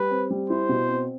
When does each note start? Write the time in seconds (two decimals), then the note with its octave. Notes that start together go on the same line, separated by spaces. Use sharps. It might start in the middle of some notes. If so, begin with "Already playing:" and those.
Already playing: G3 B4
0.11 C4
0.30 G3
0.50 E4 C5
0.69 B2
0.88 C4